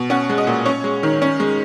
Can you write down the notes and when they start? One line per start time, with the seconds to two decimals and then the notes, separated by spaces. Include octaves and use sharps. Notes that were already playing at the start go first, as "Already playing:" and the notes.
Already playing: B2
0.10 C#4 F#5
0.29 G#3
0.38 D#5
0.47 A#2
0.66 C#4 C#5
0.84 G#3
1.03 D#3
1.22 C#4
1.40 G#3